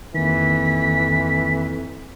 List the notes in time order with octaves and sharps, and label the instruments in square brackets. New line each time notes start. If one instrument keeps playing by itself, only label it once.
[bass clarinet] F2 [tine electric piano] D#3 A#3 [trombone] E3 [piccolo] B6